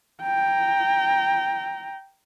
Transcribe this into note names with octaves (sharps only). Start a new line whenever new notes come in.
G5 A#5